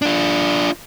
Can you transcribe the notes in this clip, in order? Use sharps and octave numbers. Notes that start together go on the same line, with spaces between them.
D4 F4